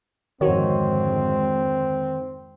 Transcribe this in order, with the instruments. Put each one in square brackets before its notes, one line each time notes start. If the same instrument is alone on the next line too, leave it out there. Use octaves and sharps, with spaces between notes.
[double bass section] F2 G#2 D3 [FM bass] D#3 [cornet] C4 [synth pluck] D#4 F#4 C#5